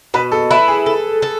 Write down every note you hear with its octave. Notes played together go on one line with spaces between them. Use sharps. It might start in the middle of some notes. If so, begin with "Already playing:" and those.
B2 B4
A4
E4 B4
G#4
A4
A4